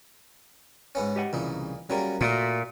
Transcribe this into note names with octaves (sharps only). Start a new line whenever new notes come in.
G#2 B3 C#4
G4 D#5 F#5
C2 A#2 C#3 E3 D#4
F#3 G3 A#3 C#4 G#4 A#4
A#2 A3 D#4 F#4 A#4